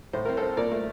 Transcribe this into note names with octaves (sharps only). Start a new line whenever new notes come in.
A2 C5
C4 A#4
A4 C5
C4
A#2 A#4 D5
A3